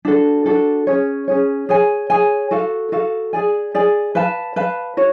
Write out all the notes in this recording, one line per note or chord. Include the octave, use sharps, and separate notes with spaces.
D4 F#4 A4
D4 F#4 A4
C#4 G#4 C#5
C#4 G#4 C#5
G#4 C#5 G#5
G#4 C#5 G#5
F#4 A4 F5
F#4 A4 F5
G#4 D5 G#5
G#4 D5 G#5
B4 F5 A5
B4 F5 A5
F#4 C#5